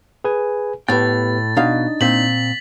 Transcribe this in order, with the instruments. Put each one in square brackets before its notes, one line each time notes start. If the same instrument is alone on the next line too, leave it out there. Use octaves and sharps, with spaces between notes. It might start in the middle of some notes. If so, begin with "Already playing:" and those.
[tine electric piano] G#4 B4 G#5
[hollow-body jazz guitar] A2 G5 [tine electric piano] B3 G4 B4 [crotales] A6
[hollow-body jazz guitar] B2 F5 [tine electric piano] D4 D#4 D#5
[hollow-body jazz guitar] A#2 C4 [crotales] B6 F#7